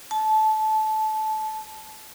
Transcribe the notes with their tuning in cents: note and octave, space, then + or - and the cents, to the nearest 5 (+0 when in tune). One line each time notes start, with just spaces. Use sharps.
A5 -20